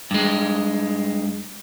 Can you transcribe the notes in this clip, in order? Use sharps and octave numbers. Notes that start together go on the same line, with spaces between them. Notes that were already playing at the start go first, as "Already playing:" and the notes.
G2 G#3